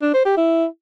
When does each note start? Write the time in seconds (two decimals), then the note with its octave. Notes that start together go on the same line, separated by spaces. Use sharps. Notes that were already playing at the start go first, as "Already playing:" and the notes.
0.02 D4
0.14 C5
0.26 G4
0.37 E4